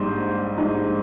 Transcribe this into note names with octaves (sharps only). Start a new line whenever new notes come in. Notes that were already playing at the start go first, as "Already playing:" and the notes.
Already playing: A#1 G#2 G3 C5
A#1 G#2 G3